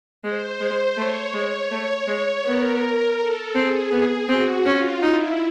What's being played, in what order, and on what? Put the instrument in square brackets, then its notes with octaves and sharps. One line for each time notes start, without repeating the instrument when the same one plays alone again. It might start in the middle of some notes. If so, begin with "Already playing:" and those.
[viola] G#3 [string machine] C5
[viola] G#3
[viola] A3 [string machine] C#5
[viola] G#3 [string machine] C#5
[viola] A3
G#3
[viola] B3 [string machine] A#4
[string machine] A4
[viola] C4 [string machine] G#4
[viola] B3
[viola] C4 [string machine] F#4
[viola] C#4 [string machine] F4
[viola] D#4 [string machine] E4